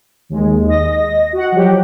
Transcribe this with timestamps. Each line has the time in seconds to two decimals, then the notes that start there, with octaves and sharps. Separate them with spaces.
0.29 D#2 G#3
0.68 D#5 A#6
1.33 F#4 F#5
1.52 F3 F#3 G4